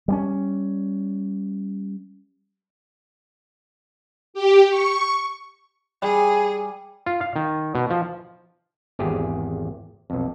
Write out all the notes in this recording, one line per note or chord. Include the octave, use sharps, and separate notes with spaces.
G3 A#3 C#4
G4
C#6
G3 G#4
F4
F5
D#3
B2
F3
G#1 E2 G4 G#4
B1 F2